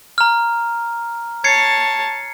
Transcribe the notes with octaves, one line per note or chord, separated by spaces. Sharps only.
A#5 F6
C#5 A5 G#6 C7 C#7